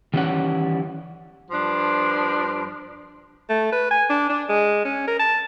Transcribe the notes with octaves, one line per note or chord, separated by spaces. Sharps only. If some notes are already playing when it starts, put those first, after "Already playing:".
D#3 E3 G3 B3 C#4 F#5
G2 F3 D4
A3
B4
G#5
D4
D4
G#3
C#4
A#4
A5